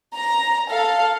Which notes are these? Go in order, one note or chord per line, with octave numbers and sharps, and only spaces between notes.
A#5
A4 F5